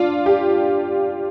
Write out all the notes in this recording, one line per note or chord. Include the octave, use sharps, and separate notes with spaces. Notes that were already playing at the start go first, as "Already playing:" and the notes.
Already playing: D4 F4
G4